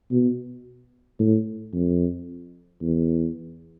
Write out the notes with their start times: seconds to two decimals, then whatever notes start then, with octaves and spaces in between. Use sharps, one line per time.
0.11 B2
1.19 A2
1.73 F2
2.82 E2